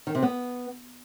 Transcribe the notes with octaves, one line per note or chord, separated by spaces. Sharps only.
D#3
C3
B3